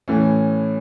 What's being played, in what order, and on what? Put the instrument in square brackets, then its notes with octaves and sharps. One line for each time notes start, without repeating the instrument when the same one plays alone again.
[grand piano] A2 E3 A3 C#4